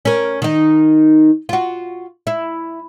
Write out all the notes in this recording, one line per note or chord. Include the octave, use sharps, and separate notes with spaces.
C#4 A#4
D#3 D#4
F4 F#4
E4